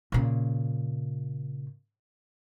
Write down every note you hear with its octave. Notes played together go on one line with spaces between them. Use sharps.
A#2 C#3